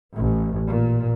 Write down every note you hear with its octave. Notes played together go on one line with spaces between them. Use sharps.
A1
A#2